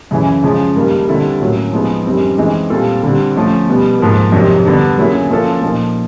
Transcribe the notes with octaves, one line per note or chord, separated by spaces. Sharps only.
F#2 C#3 E3
C#3 F3 G#3
G2 D#3 G3 A#3
D3 G3 C4 E4 A4
A2 F#3 A#3 C#4 F#4
F3 G#3 B3 D#4
F#2 D#3 G3 C4
E3 G#3 C4 D#4
A#2 G3 C4 F4 A4
D3 G3 C4
F3 A3 C#4
B2 G3 B3
G#2 F3 A#3
F2 C3 D#3 F#3
D3 G3 B3 D4
F#3 A#3 C#4 E4 G#4
F3 A#3 C#4 F4 A4
A#2 F3 A#3 D#4